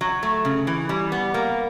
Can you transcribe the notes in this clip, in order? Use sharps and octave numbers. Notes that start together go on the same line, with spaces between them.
F#3
A3
C#3
E3
G3
B3
A#3